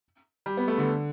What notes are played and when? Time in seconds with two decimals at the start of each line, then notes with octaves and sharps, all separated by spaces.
0.46 G3
0.57 B3
0.68 A3
0.78 D3